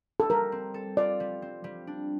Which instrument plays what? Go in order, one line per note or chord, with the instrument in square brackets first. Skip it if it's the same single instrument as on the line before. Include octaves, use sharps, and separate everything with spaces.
[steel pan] A4
[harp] G3 [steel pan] A#4
[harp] C4
A4
[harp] F4 [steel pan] D5
[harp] G3
C4
G3
D4